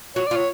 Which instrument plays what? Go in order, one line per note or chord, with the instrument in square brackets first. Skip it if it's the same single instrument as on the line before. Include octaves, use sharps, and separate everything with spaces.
[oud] F#4 [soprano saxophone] C#5
[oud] F4 [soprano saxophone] D5
[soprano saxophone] C#5